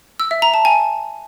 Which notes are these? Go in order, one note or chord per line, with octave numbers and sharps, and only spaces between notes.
E6
E5
A#5
A5
G#5